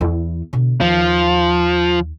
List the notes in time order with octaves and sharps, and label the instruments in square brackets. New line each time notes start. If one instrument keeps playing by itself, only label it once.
[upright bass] E2 E4
B2 D3
[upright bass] D#2 [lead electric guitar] F3